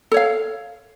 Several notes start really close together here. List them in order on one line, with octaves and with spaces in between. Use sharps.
A4 C#5 F5